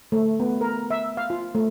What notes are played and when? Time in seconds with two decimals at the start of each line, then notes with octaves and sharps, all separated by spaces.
0.12 A3
0.40 B3
0.61 A#4
0.91 E5
1.17 F5
1.30 F4
1.55 A3